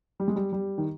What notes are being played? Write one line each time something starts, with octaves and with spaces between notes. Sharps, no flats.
G3
G#3
G3
G3
D#3